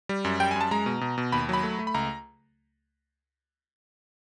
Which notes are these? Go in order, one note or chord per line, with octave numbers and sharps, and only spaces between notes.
G3
F#2
G3 G5
G#5
F#2 A5
G#3 A#5
B2
B2
B2
D#2 B5
F#3 B5
A3
A3
B5
C#2 A#5